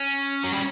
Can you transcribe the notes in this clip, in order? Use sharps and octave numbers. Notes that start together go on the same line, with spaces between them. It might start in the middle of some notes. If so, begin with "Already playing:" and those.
Already playing: C#4
F#3
G3